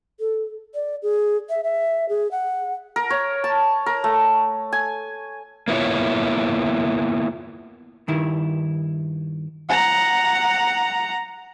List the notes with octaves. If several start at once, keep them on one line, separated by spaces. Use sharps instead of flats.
A4
D5
G#4
E5
E5
G#4
F#5
A#4
C#5
A5
A#4
A3
G#5
A#3 B3 E4 F4 C#5
G2 D#3 E4
F#5 A#5